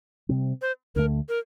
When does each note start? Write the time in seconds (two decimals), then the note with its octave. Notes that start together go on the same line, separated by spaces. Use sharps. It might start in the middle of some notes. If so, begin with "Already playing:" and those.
0.29 C3 G3 C4
0.62 C5
0.95 D2 D3 A3 A#4
1.29 A#4